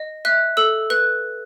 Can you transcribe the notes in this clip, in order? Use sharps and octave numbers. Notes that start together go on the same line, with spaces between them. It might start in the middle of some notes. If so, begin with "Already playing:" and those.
Already playing: D#5
E5 F#6
A4 E6
B4 F#6